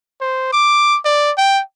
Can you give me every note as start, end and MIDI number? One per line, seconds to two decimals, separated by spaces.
0.21 0.51 72
0.53 0.98 86
1.05 1.32 74
1.37 1.61 79